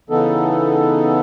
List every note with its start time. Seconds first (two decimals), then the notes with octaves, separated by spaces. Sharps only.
0.10 C#3 E3 B3 D#4 A4